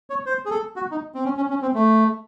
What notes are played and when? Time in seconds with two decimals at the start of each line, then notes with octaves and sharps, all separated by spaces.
0.10 C#5
0.26 C5
0.45 G#4
0.51 A4
0.76 F#4
0.91 D#4
1.14 C4
1.25 C#4
1.37 C#4
1.50 C#4
1.62 C4
1.74 A3